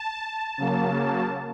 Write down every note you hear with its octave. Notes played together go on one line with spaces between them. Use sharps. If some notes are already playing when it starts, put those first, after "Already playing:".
Already playing: A5
C#3 F#3 A#3